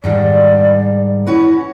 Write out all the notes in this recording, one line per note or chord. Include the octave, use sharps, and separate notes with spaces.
G#2 D#3 G3 D5
C#4 E4 F#4 B4